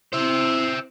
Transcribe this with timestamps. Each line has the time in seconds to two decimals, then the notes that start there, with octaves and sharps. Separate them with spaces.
0.13 C4 E4 C5 E5